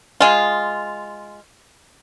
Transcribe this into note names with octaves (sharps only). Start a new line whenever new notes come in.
G#3 F4